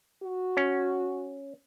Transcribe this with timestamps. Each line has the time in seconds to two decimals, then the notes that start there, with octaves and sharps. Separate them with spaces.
0.23 F#4
0.57 C#4